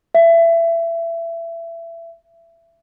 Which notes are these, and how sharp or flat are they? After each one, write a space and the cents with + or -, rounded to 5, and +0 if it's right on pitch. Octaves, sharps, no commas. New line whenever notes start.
E5 +25